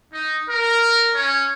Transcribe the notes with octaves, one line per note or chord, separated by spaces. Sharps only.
D#4
A#4
C#4